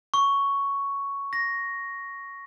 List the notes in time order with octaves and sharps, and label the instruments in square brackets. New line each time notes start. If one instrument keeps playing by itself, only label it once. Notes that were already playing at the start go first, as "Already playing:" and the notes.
[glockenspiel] C#6
A#6